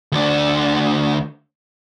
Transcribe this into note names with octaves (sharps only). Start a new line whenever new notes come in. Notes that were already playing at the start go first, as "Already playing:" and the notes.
D2 D4